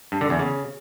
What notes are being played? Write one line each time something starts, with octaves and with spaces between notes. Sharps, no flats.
G2
D3
E2
C#3